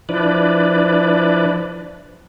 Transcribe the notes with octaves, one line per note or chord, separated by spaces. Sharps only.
F3 D4 E4 B4 D5